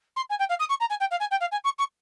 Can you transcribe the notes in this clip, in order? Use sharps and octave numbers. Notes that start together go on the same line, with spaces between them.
C6
G#5
G5
F5
D#6
C#6
A#5
G#5
G5
F5
G#5
G5
F5
G#5
C#6
C#6